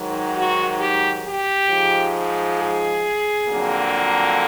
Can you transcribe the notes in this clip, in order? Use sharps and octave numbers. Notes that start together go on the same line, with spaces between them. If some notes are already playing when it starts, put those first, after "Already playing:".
Already playing: G#2 D#3 F#3
F#4
G4
G4
G#2 F3 G#3
G#4
F2 D3 F#3 A#3